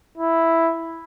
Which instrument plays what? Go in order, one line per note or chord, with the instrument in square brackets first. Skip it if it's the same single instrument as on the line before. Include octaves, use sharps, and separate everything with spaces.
[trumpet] E4